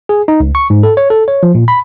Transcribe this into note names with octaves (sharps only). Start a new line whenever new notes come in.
G#4
D#4
C#2
C#6
G#2
A4
C#5
A4
C#5
F3
A#2
B5